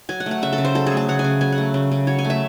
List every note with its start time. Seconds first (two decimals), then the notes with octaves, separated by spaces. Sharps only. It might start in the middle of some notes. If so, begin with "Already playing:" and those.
0.09 F#3 G#5
0.20 F#5
0.26 A3
0.31 F#5
0.42 C#3 E5
0.53 A4
0.58 C#3
0.65 C5
0.75 F#3 A4
0.86 G#4
0.92 A3
0.97 G#4
1.08 C#3 F#5
1.19 G#5
1.24 C#3
1.41 F#3 G#5
1.52 F#5
1.58 A3
1.74 C#3
1.92 C#3
2.07 F#3 C#5
2.19 G#5
2.25 A3
2.30 E5